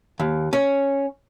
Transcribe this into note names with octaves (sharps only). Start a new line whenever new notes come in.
D#2
C#4